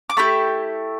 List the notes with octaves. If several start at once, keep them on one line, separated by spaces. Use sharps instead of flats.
D6
A3 E4 G4 B5